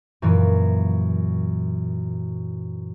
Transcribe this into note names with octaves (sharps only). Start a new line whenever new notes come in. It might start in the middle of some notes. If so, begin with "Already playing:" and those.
F#2 A#2 E3